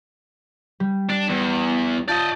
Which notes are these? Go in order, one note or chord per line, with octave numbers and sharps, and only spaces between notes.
G3
D4
E2
F4 D5 D#5 A5 G6